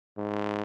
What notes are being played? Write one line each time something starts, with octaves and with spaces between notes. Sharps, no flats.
G#2